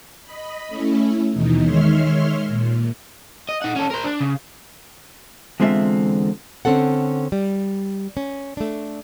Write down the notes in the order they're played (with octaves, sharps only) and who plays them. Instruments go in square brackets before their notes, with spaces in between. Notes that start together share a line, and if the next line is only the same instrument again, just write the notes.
[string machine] D#5 B5
A3 C#4 E4
D#2 B2 E3 D#4
D#3 G#3 C#5 E5 C6 F6
A#2
[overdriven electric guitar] D#5
D#4 F#5
C#4 A4
A#4 C5
D4
C#3
[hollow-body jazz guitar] E2 D3 G#3 C4 F4 E5
[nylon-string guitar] D3 C4 C#4 A4 F#5
G3
C#4
A3 D4